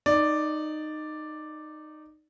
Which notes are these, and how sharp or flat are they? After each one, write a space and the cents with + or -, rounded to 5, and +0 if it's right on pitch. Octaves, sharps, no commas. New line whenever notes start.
D#4 -15 D5 +0